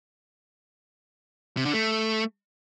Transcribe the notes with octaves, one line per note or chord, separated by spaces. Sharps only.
C3
D3
A3